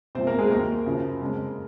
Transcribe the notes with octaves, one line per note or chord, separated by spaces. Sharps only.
C2 A#2 F3 G#3 C4 C5
A#3 A#4
G#3 G#4
D#2 D#3 F#3 A#3 A#4
F#2 C#3 F3
F2 C#3 G#3